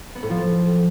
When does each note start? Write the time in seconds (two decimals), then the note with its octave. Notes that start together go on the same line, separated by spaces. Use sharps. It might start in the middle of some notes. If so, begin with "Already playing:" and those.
0.15 B3
0.23 A2
0.30 F3